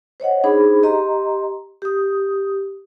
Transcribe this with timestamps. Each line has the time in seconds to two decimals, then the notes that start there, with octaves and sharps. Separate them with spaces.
0.20 C5 C#5 D#5 F#5
0.44 D4 D#4 G#4 C5 B5
0.83 G4 D#5 A#5 C6
1.82 G4 D#6